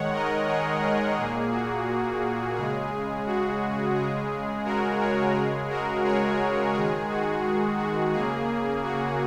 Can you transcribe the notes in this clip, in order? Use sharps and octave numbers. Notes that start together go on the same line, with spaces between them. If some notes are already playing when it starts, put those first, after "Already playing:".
Already playing: D#3 G#3 C#5 F#5
A#4 D#5
G#4 C#5
G#4
A#2 A#3 G#4
F#4
C#3 G#3 G#4
F#4
C#3 G#3 G#4
F#4 A#4
G#4 C#5
C#3 G#3 G#4
F#4 A#4
G#4 C#5
D#3 G#3 G#4
F#4
G#4
F#4
C#3 A#3 G#4
F#4